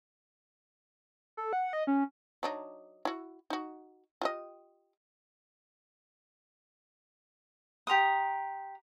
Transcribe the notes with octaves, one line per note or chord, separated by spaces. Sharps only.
A4
F#5
D#5
C#4
F#3 D4 D#4
E4 F#4
D#4 F#4
F4 G4 D#5
G4 A#5 C6 D#6